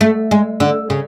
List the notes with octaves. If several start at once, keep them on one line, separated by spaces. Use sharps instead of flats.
A3
G#3
D3
C#3